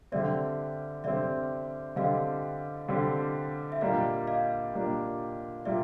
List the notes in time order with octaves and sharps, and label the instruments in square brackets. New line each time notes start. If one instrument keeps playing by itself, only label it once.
[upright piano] D3 G3 C4 [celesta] D5 E5
[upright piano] D3 G3 C4 [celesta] D5 E5
[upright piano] D3 G3 C4 [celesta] D#5 F5
[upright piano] D3 G3 C4
[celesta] E5
[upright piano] A#2 G3 A#3 D4 [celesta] D#5 F5
[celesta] D#5 F5
[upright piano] A#2 G3 A#3 D4
[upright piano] A#2 G3 A#3 [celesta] D5 E5